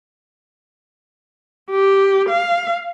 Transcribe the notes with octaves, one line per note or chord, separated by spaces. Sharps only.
G4
F5